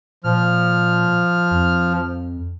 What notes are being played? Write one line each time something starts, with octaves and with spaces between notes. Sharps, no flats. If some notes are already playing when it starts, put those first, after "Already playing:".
A#2 F3 F6
F2